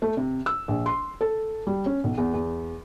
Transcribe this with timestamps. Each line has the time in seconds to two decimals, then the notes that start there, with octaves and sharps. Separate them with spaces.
0.02 A3
0.17 C3
0.46 E6
0.68 A#1
0.86 C6
1.21 A4
1.67 G3
1.86 C#4
2.04 B1
2.18 E2
2.34 E2